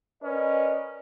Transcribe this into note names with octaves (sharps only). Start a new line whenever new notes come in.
C#4 A#4 B4 D5 D#5